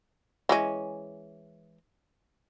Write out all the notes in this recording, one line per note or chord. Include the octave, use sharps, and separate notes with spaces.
E3 G#3 C#4